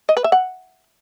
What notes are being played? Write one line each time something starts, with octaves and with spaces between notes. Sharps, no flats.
D#5
B4
E5
F#5